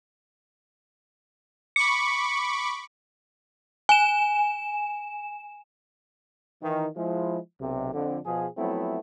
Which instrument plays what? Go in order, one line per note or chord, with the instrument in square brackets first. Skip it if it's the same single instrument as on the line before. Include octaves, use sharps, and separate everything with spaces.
[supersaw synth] B5 C#6 D6 [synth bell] C#7
[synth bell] G#5 E7
[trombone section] D#3 E3
F3 G#3 E4
B1 C3
F2 D3
B2 F3 G#4
F3 F#3 A3 B3 C4 E4